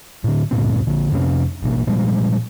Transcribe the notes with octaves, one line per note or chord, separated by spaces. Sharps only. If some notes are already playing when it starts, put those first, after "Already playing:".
A2 D3
D2 G2 A#2 C4
A#1 D3
F2 C3 A3 C#4
A1 B2 A#3
A#2 F3 G3 G#3